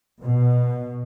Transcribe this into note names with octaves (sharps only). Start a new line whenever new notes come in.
B2